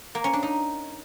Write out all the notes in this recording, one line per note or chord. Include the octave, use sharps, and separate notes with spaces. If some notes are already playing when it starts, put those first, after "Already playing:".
A#3
C#4
D4
D#4